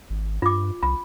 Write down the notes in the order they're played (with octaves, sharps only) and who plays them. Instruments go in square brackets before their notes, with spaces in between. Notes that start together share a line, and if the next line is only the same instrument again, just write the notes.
[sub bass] G#1
[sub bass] G2 [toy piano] F4 D6
[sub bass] C2 [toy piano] B5